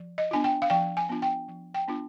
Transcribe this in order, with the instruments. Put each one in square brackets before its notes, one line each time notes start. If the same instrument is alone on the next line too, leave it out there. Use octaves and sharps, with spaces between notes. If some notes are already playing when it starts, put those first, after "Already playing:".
Already playing: [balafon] F3
D#5
B3 D4 F4 G#5
G5
F5
F3 G5
G#5
B3 D4 F4
G5
F3
G5
B3 D4 F4